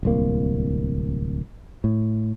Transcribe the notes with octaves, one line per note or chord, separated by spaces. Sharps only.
D1 C2 A#3
A2